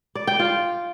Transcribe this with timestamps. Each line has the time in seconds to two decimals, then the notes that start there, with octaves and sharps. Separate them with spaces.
0.15 D5
0.27 G5
0.39 F4